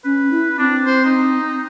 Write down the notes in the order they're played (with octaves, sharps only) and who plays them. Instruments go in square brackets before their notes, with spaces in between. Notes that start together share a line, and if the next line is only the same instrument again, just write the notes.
[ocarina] C#4 [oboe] B4
[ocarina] E4
[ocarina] C4 [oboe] D4
[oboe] C5
D#4